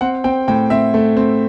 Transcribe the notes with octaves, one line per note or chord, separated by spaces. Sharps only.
C4 F#5
C4 G5
A2 G5
C4 E5
A3
C4